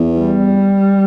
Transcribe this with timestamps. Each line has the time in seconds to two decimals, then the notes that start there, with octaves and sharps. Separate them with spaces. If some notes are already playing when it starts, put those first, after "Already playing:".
Already playing: E2
0.20 G3